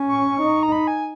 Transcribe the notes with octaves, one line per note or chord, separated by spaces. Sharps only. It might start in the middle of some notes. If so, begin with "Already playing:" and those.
Already playing: C#4
C#6
D#4
A#5
B5
G#5